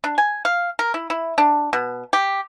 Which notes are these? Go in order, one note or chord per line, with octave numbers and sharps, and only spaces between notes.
D4
G#5
F5
A#4
E4
E4
D4
B2
G4